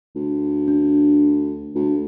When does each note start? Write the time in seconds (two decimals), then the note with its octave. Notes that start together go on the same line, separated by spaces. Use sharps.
0.16 D2
0.68 D4
1.75 D2